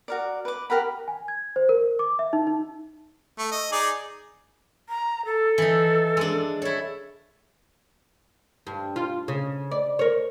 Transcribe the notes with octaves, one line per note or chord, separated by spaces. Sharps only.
F#4 A#4 D5
B4 D6
G4 A#4 F#5 B5
G#5
G#6
C5
A#4
D6
E5
D#4
D#4
A3
D#5
D#4 G#4 D5
A#5
A4
E3 D#4
G#3 D4
E4 A4 C#5
G2
F4
C#3
D5
A#4 C#5